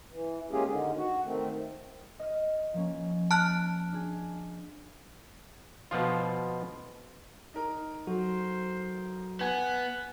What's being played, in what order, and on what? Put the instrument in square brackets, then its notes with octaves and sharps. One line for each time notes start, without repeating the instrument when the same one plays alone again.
[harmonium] E3
G#3 A#3 C#4 F4 G4 G#4
D3 D#3
F#4
D#3 A3 C4
[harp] D#5 F6
F3 A#3 C#4
[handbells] A5 F6 F#6
[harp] D4 G#4
[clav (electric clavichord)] B2 F3 F4
[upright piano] D#4 A#4
[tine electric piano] F#3 F#4 A4 [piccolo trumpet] C5
[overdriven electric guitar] B3 [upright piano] F#5 G#5 G#6 [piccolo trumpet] F#6